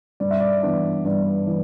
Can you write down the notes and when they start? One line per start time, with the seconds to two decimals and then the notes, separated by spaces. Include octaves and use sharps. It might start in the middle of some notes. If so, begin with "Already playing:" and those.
0.20 G2 D5
0.31 E5
0.40 D5
0.63 E3 B3 D4
1.05 G2 D5
1.47 E3